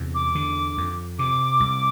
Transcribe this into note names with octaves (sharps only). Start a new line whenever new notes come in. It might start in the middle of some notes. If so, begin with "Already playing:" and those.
Already playing: E2 C3
D6
D3
F2
C3 D6
C2